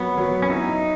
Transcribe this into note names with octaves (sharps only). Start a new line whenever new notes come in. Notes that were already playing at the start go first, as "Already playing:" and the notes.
Already playing: F#3 B3
F#3
C#4
D#4 E4